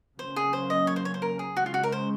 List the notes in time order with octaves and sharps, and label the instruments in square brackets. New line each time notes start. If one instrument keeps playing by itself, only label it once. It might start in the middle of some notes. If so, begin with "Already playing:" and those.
[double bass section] C#3 F#3 A#3 C#4 [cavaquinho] C5
[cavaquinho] G#4
C5
D#5
C#5
C5
C#5
C5
A#4
G#4
[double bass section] C#3 G#3 C#4 [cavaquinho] F#4
[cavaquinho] F4
F#4
A#4
C5